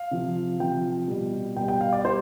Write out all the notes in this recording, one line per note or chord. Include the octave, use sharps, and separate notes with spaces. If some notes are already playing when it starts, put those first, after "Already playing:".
Already playing: F5
C3 F3
C3 F3 G5
B2 G3
B2 G3 G5
G5
F5
D5
G3 C5